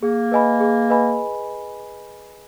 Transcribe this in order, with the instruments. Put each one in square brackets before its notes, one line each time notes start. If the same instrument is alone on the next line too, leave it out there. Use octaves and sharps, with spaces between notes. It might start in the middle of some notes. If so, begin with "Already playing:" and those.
[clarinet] A#3 [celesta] G#4
[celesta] B4 D#5 G#5 B5
G#4
B4 D#5 G#5 B5